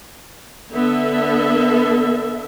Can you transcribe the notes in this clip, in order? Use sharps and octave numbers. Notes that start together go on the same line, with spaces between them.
D3 B3 A4 E5